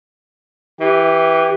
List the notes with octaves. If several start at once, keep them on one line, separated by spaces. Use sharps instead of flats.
E3 G4